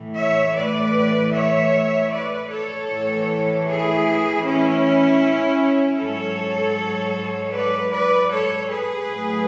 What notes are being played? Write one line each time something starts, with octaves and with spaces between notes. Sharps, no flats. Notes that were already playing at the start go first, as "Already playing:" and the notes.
Already playing: A2 E3
C#5 E5
B4 D5
C#5 E5
B4 D5
A4 C#5
A2 E3
E4 G#4
C#4 E4
G#2 F#3 A4 C#5
B4 D5
B4 D5
A4 C#5
G#4 B4
A2 F#3